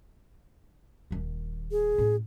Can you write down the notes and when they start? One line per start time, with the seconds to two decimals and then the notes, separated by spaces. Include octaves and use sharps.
1.11 D#1 D#3
1.71 G#4
1.98 A2 C#4